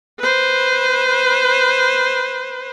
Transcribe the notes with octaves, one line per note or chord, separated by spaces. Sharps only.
B4 C5